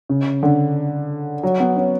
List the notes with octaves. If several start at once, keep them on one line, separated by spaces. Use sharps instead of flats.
C#3
D3
F#3
B3
C#4